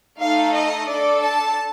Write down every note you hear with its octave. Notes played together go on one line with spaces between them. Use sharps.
A3 D#4 A4 F5
D#5
D4 A4 D5
A5